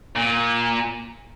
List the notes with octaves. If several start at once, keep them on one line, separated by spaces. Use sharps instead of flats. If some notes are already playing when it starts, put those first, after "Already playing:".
A#2